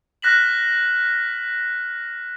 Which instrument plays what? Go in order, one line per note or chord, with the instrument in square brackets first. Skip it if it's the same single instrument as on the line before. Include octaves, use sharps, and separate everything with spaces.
[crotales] F6 F#6 A#6 B6 E7 F#7